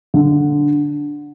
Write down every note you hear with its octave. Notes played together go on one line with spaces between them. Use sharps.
D3